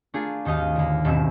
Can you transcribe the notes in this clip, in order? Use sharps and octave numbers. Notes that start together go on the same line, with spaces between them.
A3 D4 F4 G#4 A#4
G#1 D#2 D#4 D#5 F5
D#2 D3
D#1 G#1 B2 E5 E6